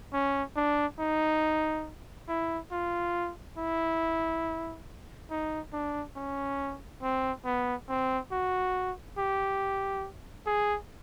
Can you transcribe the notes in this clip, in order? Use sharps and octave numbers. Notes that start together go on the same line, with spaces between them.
C#4
D4
D#4
E4
F4
E4
D#4
D4
C#4
C4
B3
C4
F#4
G4
G#4